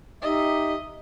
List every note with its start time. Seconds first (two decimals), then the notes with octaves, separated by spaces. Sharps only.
0.22 D#4 G4 D#5 E5